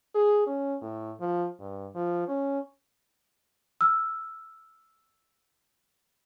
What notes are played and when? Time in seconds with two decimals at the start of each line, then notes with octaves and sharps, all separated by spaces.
0.15 G#4
0.47 C#4
0.82 A2
1.21 F3
1.60 G2
1.95 F3
2.28 C#4
3.81 E6 F6